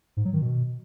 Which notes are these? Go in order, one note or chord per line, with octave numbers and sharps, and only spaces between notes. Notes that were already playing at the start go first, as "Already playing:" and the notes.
G#2
F#3
D#3
B2